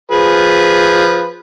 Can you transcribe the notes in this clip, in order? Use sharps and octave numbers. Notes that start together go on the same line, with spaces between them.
F3 G#4 B4